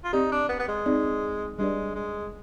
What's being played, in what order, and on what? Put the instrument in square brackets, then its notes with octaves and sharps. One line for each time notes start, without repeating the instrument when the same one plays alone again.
[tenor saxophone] F4
[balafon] C4 G4 D5 [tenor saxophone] D#4
[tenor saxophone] D4
B3
B3
G#3
[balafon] C4 D#4 G#4 D5
[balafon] G3 D4 G4 B4 D5 [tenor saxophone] G#3
[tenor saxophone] G#3